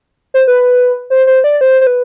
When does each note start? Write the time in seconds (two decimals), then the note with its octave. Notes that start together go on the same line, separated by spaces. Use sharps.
0.34 C5
0.47 B4
1.10 C5
1.27 C5
1.44 D5
1.61 C5
1.81 C5
1.87 B4